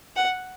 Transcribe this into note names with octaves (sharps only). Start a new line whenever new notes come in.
F#5